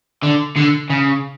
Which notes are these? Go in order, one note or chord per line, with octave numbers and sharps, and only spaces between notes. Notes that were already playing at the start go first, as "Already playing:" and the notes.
D3
D3
C#3